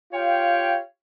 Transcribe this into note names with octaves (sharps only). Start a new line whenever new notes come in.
F4 G4 C#5 F5 G5